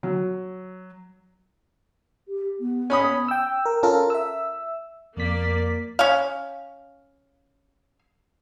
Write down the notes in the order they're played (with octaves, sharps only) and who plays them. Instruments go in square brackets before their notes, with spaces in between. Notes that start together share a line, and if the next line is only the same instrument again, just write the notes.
[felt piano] F#3
[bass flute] G4
B3
[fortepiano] C#4 B5 D#6
[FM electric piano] G5 E6
A#4
C#4 F4 A4 A#4
E5 E6
[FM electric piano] F2 B6 [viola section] A#3 D5
[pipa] C#4 F5